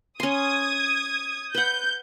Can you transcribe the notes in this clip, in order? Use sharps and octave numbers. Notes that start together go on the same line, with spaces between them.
C#4 C6 D#6 G#6
B4 F#5 G6